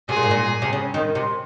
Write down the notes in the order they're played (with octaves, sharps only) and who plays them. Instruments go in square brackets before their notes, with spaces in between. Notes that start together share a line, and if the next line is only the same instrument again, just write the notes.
[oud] C3 [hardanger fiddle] G#4
[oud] A#2
G#2
A#2
C3
C#3
D#3
C3